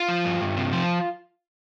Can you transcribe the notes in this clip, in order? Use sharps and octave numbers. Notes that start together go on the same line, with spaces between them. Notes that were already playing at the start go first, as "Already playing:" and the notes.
Already playing: F4
F3
G2
G2
C3
F3